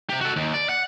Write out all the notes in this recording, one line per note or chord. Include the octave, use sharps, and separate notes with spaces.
C3 G4
F#4 A4
D#2
D5
F#5